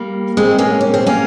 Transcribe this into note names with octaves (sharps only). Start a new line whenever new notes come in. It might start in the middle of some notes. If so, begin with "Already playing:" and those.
Already playing: G3 A#3
G#3 C4
A#3 C#4
C#4
C4
A#3 C#4